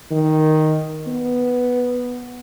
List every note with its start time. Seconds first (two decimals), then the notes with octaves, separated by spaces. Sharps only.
0.11 D#3
1.07 B3